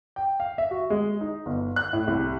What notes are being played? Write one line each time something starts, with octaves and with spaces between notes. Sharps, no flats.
G5
F5
E5
F#4
G#3
D#4
G1
F#6
A2
C2